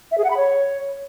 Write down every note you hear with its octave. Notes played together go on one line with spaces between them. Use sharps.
E5
G#4
F#5
B5
C#5